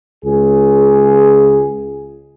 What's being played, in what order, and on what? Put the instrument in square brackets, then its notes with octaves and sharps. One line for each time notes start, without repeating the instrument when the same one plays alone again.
[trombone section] C#2 G#4